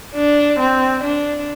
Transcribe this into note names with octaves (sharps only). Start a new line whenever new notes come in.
D4
C4
D4